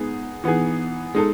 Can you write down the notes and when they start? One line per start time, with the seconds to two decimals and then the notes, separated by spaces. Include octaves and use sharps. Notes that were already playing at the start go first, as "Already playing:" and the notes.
Already playing: G#3 B3 D#4 G#4
0.44 E3 B3 D#4 G#4
1.15 G#3 D#4 A4